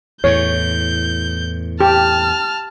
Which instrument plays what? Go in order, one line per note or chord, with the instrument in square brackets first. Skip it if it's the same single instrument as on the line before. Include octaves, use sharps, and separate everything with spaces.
[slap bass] E2 A2 [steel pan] C#5 [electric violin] G6
[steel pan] G4 [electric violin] A5 F6